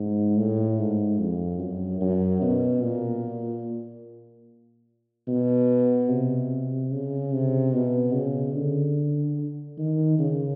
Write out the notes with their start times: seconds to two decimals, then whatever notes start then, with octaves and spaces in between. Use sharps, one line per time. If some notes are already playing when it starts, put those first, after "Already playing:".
Already playing: G#2
0.37 A2
0.79 G#2
1.19 F2
1.60 F#2
2.01 F#2
2.42 B2
2.83 A#2
5.28 B2
6.09 C3
6.91 C#3
7.33 C3
7.73 B2
8.14 C#3
8.55 D3
9.78 D#3
10.19 C#3